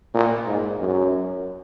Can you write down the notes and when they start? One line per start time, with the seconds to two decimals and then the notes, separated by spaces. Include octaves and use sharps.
0.15 A#2
0.47 G#2
0.81 F#2